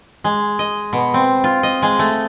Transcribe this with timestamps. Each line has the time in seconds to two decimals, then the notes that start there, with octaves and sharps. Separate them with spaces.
0.24 G#3
0.59 D#5
0.93 B2
1.14 C4
1.44 F4
1.63 D#5
1.82 G#3
1.99 A3